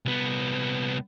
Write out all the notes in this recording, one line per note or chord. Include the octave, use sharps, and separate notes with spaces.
C2 B3